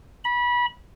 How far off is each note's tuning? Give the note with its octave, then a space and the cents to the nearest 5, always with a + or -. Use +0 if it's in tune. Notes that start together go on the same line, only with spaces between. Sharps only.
B5 -25